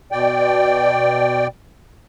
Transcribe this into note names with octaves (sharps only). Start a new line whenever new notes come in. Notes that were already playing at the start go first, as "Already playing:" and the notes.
B2 D5 G5